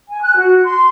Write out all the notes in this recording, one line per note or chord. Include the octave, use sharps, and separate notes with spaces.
G#5
F#6
F#4
C6